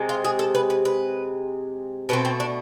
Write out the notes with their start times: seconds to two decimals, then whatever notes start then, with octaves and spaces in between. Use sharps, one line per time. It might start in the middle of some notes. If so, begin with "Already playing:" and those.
Already playing: C3 G#3 C4
0.09 F4
0.25 G#4
0.39 A4
0.55 B4
0.70 B4
0.85 B4
2.09 B2 A3 C4 B4
2.25 C4
2.40 D4